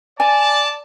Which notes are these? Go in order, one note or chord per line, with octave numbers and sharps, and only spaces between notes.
D5 G#5 A5